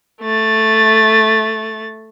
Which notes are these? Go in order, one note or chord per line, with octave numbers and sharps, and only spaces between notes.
A3 A6